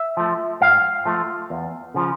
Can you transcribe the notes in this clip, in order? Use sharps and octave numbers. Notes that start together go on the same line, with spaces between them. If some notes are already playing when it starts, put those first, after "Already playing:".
Already playing: E5
F3 A3
G#2 F5
F3 A3
E2
C#3 F3